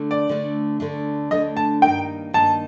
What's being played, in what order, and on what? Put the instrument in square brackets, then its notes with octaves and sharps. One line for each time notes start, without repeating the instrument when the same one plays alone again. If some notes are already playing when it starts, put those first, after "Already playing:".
Already playing: [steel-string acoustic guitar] D3 A3 D4
[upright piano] D5
[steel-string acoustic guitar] D2 D3 A3 D4
D2 D3 A3 D4
[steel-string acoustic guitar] D2 D3 A3 D4 [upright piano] D#5
[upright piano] A5
[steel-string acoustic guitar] G2 D#3 A#3 D#4 [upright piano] G5
[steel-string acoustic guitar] G2 D#3 A#3 D#4 [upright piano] A5